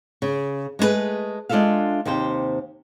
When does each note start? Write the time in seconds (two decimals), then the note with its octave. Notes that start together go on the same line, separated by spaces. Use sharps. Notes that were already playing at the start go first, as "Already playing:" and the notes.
0.22 C#3
0.79 G#3 A3 C#4 G#4 B4
1.49 G#3 D4 F4 A4 E5 F5
2.05 D#2 C3 G4 C5 G5